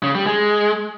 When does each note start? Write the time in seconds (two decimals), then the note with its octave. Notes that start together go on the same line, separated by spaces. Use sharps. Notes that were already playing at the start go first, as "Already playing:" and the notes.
0.03 C#3
0.15 G3
0.26 G#3